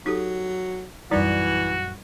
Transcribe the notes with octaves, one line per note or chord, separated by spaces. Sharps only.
F#3 D#4 G4 A4
A#1 F#2 E3 G3 D#4 F#4 D5